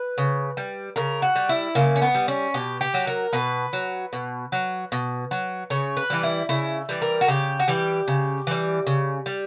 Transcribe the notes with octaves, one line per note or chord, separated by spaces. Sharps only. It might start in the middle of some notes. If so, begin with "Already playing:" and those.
Already playing: B4
C#3
G3
C#3 A#4
F#4
G3
E4
C#3 A#3
C#4
B3
G3
C#4
B2 G4
G4
F#3
A#4
B2 B4
F#3
B2
F#3
B2
F#3
C#3 C#5
B4
E3 G3
E4
C#3 E4
E3 G3
A#4
F#4
C#3 G4
F#4
E3 G3 G4
C#3
E3 G3
C#3
G3